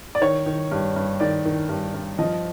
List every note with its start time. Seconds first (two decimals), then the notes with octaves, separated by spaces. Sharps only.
0.15 D5
0.21 D#3 C#5
0.46 D#3
0.71 G2
0.96 G2
1.20 D#3 D5
1.45 D#3
1.69 G2
1.94 G2
2.19 F3 D#5